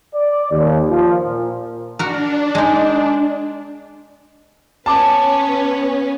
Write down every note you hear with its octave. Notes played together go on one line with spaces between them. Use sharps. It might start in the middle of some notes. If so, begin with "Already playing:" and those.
D5
D#2
F3
A#2
D4 F#4 A#4
G#3 D#4
B3 C#4 B4 A5 D6